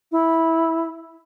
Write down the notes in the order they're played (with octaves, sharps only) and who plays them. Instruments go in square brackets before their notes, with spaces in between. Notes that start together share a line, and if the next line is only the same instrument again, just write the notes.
[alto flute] E4